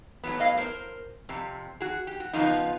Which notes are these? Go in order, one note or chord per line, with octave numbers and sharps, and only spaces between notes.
A2 F#3 B3
D#5 F5
A#4 C5
F2 C3
F#4 G#4
G4
F#4
F2 C#3 F3 B3 D#4 F4